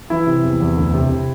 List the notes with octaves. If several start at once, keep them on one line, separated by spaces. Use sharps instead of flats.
E3 E4
C3
E2
E2
D2
C3
C3